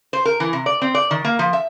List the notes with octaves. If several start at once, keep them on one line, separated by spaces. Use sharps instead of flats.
C5
A#4
E3
C3
D5
C4
D5
D#3
A#3
F3
E5